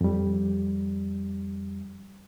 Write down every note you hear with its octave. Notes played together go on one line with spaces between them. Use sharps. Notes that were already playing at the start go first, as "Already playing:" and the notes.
F2 G3